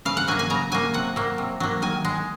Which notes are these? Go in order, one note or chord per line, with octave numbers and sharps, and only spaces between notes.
C#3 F5
F#5
F#3 A#3 G#5
G#5
C#3 A#5
F#3 A#3 G#5
C3 F#5
F#3 A#3
C3
F#3 A#3
D#3 G#5
G#3